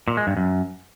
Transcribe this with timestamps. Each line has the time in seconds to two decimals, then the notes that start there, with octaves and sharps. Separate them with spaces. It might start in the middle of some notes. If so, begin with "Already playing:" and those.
0.08 A#2
0.17 G#3
0.27 G2
0.37 F#2